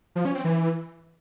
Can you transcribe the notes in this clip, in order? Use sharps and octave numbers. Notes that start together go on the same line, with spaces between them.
F3
C#4
C4
E3